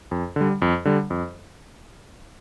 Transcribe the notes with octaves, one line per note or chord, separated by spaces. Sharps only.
F2
D3 G3
F2
D3 G3
F2